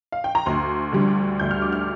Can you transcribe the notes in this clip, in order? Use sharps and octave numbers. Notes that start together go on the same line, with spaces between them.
F5
G5
A#5
D2 C6
D3 G3
D2 G6
F6
D6
F6